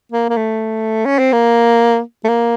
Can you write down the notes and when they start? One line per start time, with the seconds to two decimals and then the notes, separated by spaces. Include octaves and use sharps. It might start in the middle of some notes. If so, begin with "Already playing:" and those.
0.12 A#3
0.29 A#3
0.36 A3
1.05 C#4
1.19 C4
1.32 A#3
2.24 A3
2.28 A#3